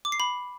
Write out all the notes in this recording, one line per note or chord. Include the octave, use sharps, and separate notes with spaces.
D6
C7
B5